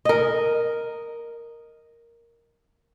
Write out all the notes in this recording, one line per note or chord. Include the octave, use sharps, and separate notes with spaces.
A#4 D#5